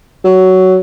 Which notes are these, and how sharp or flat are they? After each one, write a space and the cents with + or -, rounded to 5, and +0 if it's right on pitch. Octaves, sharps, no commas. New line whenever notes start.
F#3 +15